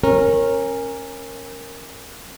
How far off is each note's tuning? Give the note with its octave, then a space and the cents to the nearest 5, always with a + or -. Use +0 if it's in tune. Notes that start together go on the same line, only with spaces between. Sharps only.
C#4 -25 A#4 +0